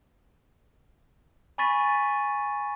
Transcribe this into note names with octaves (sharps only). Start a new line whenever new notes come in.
G#5 B5 C#6 A6 B6 D#7